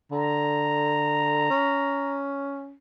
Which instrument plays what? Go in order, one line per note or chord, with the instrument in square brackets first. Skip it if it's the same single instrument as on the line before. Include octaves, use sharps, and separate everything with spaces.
[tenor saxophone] D3 [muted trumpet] A#5
[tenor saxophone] C#4